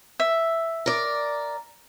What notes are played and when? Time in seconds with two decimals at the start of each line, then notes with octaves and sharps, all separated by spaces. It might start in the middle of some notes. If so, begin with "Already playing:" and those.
0.20 E5
0.86 A#4 D5